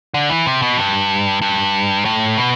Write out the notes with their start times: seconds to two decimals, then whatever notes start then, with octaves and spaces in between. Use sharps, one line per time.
0.14 D3
0.29 E3
0.46 C3
0.62 B2
0.77 G2
1.42 G2
2.05 A2
2.38 B2